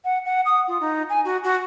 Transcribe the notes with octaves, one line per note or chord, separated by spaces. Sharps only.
F#5
F#5
D#6
F4
D#4
G#5
F#4
F#4